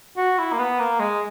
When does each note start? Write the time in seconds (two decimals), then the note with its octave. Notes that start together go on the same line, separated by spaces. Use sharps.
0.17 F#4
0.38 E4
0.53 A#3
0.59 B3
0.79 A#3
0.99 G#3